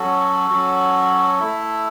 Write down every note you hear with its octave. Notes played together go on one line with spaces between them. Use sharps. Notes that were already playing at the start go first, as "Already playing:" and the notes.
Already playing: F#3 C#4 F#4 A4
F#3 C#4 F#4
A3 E4